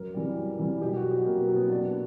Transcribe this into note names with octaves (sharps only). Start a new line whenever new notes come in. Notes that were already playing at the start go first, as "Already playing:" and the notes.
Already playing: F#2 A#4
E3 G3
F#2
E3 G3
B2 G4
F#4
F#3
G4
B2 A#3
B3
F#3
B3
B2 D4
B3